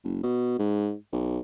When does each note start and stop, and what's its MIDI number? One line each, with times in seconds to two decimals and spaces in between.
0.04 0.23 30
0.23 0.56 47
0.59 0.94 44
1.13 1.39 35